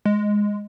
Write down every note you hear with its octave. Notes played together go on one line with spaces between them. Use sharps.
G#3